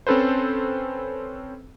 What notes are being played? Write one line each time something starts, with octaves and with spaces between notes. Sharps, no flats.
C4 C#4 A4 B4 C5